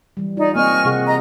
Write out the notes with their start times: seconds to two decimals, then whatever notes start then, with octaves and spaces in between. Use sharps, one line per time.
0.17 E3 G3
0.37 D#4 F4 D5
0.55 A#3 C4 D#5 G#5 C#6 F6
0.85 C3 G#4 F#5
1.07 D#5 A#5